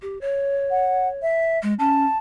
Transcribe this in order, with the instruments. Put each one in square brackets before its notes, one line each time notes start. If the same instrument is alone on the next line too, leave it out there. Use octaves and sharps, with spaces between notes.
[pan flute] G4
C#5
[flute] F#5
E5
[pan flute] G#3
[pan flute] C#4 [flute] A5